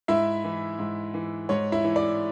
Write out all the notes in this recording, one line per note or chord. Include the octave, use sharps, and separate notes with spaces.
G#2 E4 E5
E3
G#2
E3
G#2 C#5
E4 E5
E3
D5